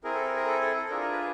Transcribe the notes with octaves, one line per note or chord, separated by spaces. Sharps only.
C4 E4 G#4 A#4
A4
A#4
A#4
A4
A4
A4
D4 F4 G#4 A#4
A#4
B4